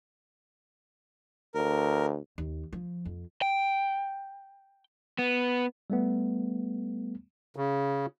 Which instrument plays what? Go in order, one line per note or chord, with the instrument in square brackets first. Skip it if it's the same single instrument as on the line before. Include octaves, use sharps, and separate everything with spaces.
[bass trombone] D2 [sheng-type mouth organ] A#4
[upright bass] D#2
F3
F2
[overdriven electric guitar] G5
B3
[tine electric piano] G3 A3 B3
[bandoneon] C#3